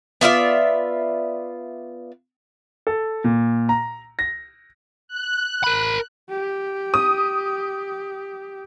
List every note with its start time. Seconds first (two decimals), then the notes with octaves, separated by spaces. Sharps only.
0.21 B3 F4 D5 E5
2.87 A4
3.24 A#2
3.69 A#5
4.19 A#6
5.08 F#6
5.64 A#4 B5
6.30 G4
6.94 D#6